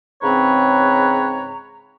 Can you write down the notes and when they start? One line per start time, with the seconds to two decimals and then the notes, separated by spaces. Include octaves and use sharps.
0.22 G#2 C#3 C4 B4 C#5 A#5